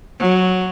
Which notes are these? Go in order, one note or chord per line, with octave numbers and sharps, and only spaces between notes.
F#3